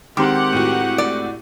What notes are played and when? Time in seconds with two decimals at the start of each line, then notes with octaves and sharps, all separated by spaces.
0.17 D#3 G#3 C4 G4 F#5 C6 D6
0.53 A2 F#4
0.98 D5